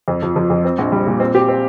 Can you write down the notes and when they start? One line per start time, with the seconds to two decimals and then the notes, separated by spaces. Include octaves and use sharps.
0.08 F2
0.22 F3
0.36 F3
0.50 F2
0.65 C4
0.78 A#1
0.92 G3
1.07 A#2
1.20 C4
1.35 G4
1.49 C4